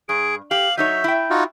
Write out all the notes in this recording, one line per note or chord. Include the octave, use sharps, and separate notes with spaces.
G2 G#4 D7
G4 F5 F#7
F#3 D#4 C#5 E5 G6
E4 G5
D#4 F4 F#4